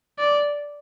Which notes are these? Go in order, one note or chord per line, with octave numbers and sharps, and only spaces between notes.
D5